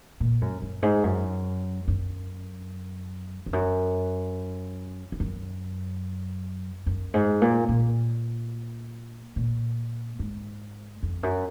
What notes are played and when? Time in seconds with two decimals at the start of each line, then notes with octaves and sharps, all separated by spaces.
0.20 A#2
0.41 F#2
0.62 F#2
0.82 G#2
1.04 F#2
1.88 F#2
3.46 F2
3.53 F#2
5.12 F2
5.20 F#2
6.86 F#2
7.14 G#2
7.42 A#2
7.69 A#2
9.36 A#2
10.19 G#2
11.03 F2
11.23 F#2